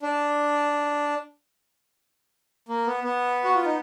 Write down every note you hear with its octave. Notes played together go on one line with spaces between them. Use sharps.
D4
A#3
B3
B3
F#4
F4
D#4